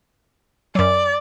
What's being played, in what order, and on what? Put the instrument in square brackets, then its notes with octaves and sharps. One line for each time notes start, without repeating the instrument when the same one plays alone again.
[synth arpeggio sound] F#2 F#3 [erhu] D5